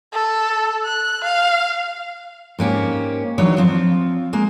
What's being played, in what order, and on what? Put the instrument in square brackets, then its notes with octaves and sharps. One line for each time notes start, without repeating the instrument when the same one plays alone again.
[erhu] A4
F#6
F5
[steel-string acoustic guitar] G#2 A#3 C#4 G4
E3 F#3 D4 D#4 C#5
F3 C4 F4
G#3 A#3